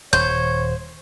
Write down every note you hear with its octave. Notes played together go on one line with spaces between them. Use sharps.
D#1 C5 C#5 G6